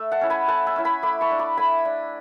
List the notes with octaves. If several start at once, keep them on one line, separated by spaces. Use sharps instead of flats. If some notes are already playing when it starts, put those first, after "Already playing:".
Already playing: A3 E5
F#5 A5
C#4 E4
G#5 B5
A3 F#5 A5
E5 G#5
C#4 E4
G#5 B5
A3 B5 D6
A5 C#6
D4
B5 D6
A3 G#5 B5
D4